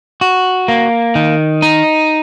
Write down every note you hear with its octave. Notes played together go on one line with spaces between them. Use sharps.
F#4
A#3
D#3
D#4